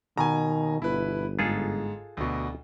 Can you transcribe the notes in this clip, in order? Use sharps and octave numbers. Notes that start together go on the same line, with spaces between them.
B2 D#3 G#5 A#5
G1 E4 B4
G#2 F4 G#4 A4
D2 B2